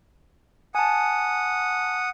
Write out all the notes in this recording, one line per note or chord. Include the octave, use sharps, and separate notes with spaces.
F#5 G#5 A5 D#6